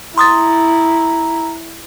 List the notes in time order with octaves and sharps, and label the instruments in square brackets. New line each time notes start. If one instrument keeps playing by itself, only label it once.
[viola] E4 [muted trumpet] A#5 [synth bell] C6 D#6 A6